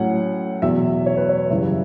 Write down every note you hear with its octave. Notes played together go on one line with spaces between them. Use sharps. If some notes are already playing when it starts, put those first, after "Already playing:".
Already playing: A2 F#3 C#4 F#5
E2 B2 F#3 E5
C#5
B4
C#5
F#2 C#3 E3 G3 E5